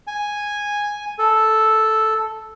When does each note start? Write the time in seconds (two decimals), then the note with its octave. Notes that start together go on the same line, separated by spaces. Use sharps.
0.07 G#5
1.19 A4